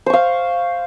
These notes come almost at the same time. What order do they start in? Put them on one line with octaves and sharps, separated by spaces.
C5 C#6 F5